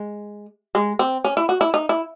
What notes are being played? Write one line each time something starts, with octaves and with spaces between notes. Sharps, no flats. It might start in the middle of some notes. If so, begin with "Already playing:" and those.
Already playing: G#3
G#3
C4
C#4
E4
F#4
E4
D#4
E4